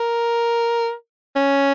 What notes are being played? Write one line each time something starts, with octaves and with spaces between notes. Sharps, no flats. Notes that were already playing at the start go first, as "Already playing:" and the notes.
Already playing: A#4
C#4